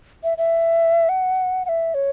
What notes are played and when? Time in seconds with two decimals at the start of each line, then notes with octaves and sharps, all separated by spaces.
0.24 E5
0.38 E5
1.09 F#5
1.65 F#5
1.69 E5
1.94 C#5